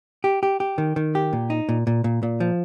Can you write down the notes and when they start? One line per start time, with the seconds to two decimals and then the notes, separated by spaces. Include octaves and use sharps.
0.24 G4
0.43 G4
0.60 G4
0.78 D#3
0.96 D#3
1.15 G4
1.33 A#2
1.50 D#4
1.69 A#2
1.87 A#2
2.04 A#2
2.23 A#2
2.40 F3